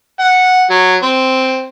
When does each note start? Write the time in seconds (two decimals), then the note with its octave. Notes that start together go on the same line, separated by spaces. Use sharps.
0.19 F#5
0.70 F#3
1.03 C4